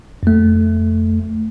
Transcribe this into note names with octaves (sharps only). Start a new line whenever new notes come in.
F2 A3